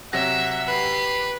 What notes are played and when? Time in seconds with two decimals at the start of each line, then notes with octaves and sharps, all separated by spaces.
0.13 C3 F#3 E5 F#5 A#6
0.68 G4 B4 C7